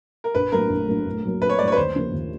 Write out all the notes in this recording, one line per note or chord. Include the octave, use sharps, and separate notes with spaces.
A#4
A#1 B4
A2 F#3 A#3 A#4
A#1
A2 F#3 A#3
A#1
A2 F#3 A#3
A#1 B4
C#5
A2 F#3 A#3 D5
C#5
B4
D#2 C5
C#3 F3 A#3
D#2